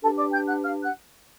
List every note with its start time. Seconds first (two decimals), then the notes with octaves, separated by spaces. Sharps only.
0.01 D4 G4 A4 B4 A5
0.17 D5 D6
0.32 G5 G6
0.46 F#5 F#6
0.61 F5 F6
0.82 F#5 F#6